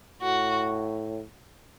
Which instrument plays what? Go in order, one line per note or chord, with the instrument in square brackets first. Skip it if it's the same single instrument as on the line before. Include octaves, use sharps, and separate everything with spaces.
[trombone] A2 [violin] F#4